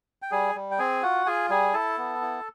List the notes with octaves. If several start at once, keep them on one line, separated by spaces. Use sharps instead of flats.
G5
G3 G#4 G#5
G3
G5
C4 G#4 G#5
F4 F#4 F#5
F4 G#4 G#5
G3 G#4 G#5
E4 A4 A5
B3
E4